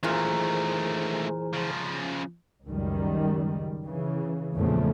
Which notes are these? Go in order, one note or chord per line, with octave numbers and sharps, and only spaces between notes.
F#2 A#2 D#3 E3 A3 G#4 C5
C#3 F3
C#2 F#2 D#3 G3
C#3 E3
E2 A#2 C#3 F3 A3